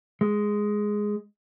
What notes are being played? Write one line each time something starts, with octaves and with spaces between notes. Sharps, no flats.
G#3